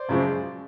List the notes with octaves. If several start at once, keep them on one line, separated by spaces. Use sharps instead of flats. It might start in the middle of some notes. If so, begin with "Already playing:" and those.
Already playing: C5 D5
F#2 C#3 F3 G#3